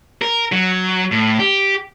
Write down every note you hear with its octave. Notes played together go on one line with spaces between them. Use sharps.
A#4
F#3
A2
G4